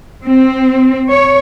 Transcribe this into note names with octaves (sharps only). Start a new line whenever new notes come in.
C4
C#5